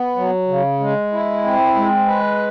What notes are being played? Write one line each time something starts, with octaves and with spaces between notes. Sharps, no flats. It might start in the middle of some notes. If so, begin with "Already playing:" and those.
Already playing: B3
F#3
C#3
G#3
E4
C4
G#3
B4